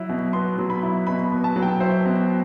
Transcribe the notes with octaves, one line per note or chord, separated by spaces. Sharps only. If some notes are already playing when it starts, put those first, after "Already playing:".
Already playing: F#3 E4
B2
B3 C6
F#3
B5
E4
B2 B5
B3
A5
F#3
G5
E4 C5
B2